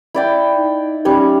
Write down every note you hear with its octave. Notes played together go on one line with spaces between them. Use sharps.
E4 D5 G5
D#4
G3 C#4 C#5